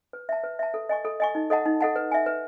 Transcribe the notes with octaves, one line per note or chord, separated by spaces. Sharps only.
B4
E5 A5
B4
E5 A5
A4
D#5 G#5 C#6
A4
D#5 G#5 C#6
D#4
A4 D#5 F#5 A5
D#4
A4 D#5 F#5 A5
B4
E5 G#5
B4